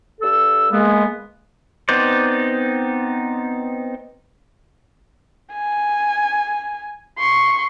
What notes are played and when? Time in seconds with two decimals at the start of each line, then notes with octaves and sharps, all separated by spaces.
0.20 G2 A4 E6
0.71 G#3 A#3 B3
1.89 B3 C4 D#4 C5 D5
5.53 G#5
7.18 C6 C#6